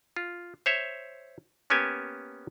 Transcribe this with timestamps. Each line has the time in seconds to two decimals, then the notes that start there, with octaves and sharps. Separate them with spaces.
0.16 F4
0.66 C5 C#5 E5
1.70 A#3 B3 C#4 G4 G#5 A5